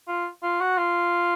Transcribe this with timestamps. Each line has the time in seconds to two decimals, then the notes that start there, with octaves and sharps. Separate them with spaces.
0.08 F4
0.43 F4
0.61 F#4
0.78 F4